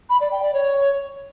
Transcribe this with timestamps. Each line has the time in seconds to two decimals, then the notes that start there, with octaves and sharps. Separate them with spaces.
0.09 B5
0.20 D5
0.31 G5
0.42 D5
0.53 C#5